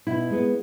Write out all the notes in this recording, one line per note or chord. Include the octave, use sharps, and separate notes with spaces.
B2 E4
G#3 B3